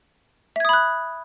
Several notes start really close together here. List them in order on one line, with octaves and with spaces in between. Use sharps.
E5 G#6 D#6 B5 F#6